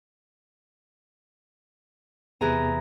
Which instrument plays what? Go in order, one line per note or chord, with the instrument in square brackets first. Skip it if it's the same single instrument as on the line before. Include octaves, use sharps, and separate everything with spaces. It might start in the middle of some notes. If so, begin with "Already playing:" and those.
[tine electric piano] E2 C3 [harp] E3 G#4 A#5